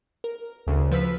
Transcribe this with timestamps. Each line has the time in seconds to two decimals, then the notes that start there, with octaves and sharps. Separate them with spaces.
0.24 A#4
0.67 D2 C#3
0.91 F3 B4 E6 B6